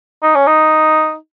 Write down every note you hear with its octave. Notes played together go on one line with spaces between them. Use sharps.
D#4
C#4
D#4